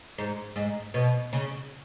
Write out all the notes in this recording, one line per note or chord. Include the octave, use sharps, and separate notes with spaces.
G#2
G#2
B2
C#3